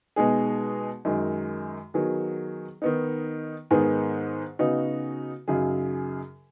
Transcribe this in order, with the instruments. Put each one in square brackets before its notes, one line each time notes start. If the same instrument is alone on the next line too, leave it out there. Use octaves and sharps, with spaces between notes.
[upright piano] B2 G#3 D#4 G#4
F#2 D#3 G#3
D#3 F#3 B3 G#4
D#3 B3 D#4
G#2 D#3 B3 G#4
C#3 B3 D#4 F#4
F#2 C#3 F#3 D#4 G#4